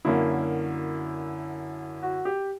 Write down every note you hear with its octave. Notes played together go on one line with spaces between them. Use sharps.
F#2 D3 F#3 A#3 E4
F#4
G4